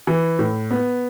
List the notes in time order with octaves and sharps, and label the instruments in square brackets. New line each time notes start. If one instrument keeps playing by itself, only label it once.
[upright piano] E3
A2
B3